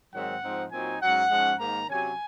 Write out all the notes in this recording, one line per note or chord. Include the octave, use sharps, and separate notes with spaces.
G#2 D#3 F#3 C4 F#5
G#2 F3 C4 D#4
A#2 F#3 C4 D#4 G#5
G#2 F#3 C#4 F#5
G#2 F3 G#3 C#4
G#2 D#3 A#3 D#4 A#5
C3 F#3 C#4 G#5